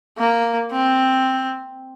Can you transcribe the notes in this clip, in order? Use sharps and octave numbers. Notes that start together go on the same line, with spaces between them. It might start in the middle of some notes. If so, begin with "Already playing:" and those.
A#3
C4